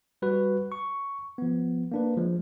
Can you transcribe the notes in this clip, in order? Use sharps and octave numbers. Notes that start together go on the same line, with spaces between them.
G3 F#4 B4
C#6
F3 B3
A#3 D4 B4
F3 G#3